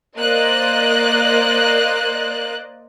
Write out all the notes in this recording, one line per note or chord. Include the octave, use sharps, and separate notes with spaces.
A#3 C5 D5 D#5 F#6